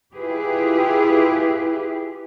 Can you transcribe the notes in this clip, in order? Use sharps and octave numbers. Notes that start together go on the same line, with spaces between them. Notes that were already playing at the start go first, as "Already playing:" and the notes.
E4 F4 G4 G#4 B4